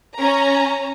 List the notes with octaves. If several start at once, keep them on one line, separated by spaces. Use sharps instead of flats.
C#4 A#5